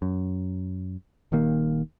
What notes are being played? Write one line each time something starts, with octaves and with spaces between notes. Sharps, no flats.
F#2
D#1 D#2 D#3 A#3